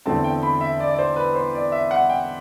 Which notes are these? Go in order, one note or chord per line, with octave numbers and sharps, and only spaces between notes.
E2 D3 A3 C4 A5
G5
B5
E5
D5
D5
C5
B4
C5
D5
E5
F#5
G5